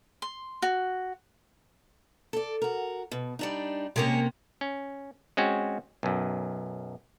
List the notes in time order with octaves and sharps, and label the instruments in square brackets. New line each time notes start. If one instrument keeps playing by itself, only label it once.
[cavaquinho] C6
F#4
[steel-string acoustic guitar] A4 D5
F#4 A#4
B2
G3 D4 D#4
[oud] C3 A#3 C#4 [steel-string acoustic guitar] G#3 G#4 C#5
[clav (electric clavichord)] C#4
G#3 C4 C#4 F#4
B1 F#2